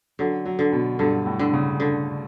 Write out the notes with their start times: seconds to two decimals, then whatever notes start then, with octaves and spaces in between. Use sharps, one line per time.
0.19 D3 F#3
0.45 F#3
0.59 D3
0.72 B2
0.99 G2 D3
1.26 A2
1.39 D3
1.53 C#3
1.80 D3